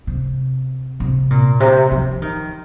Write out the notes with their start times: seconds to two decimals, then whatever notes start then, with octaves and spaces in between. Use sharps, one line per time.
0.07 C3
1.00 C3
1.30 A#2
1.60 C3
1.91 F3
2.22 D#3